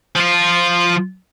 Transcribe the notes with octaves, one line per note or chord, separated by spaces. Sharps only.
F3 F4